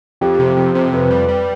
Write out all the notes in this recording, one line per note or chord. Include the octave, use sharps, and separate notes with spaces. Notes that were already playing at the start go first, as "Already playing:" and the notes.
F2 G4
C3
F2
C3
F2 B4
G3
G3